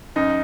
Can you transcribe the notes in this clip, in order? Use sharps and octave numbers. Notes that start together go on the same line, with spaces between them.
F#2 D#4